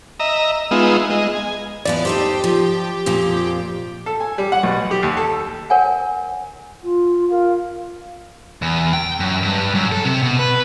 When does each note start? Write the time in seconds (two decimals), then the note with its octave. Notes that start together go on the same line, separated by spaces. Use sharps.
0.20 D#5 E5 A#5
0.71 G#3 B3 D#4 F4 E5
1.10 G#3 D#5
1.35 G#5
1.85 E2 F3 B3 D5
2.05 D#4 G4 A4 C5
2.44 F3
3.06 F2 A#2 F3
4.06 A4
4.20 G#5
4.38 G3
4.52 F#5
4.63 B1
4.91 G4
5.03 D#2
5.17 A4
5.70 A#4 C#5 F#5 G#5
6.84 F4
7.31 F4 A#4
8.62 E2
8.93 G5
9.20 F#2
9.43 G2
9.75 F#2
9.92 A4
10.05 C3
10.23 B2
10.39 B4